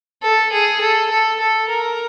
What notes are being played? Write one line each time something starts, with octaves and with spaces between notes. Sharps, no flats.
A4
G#4
A4
A4
A4
A#4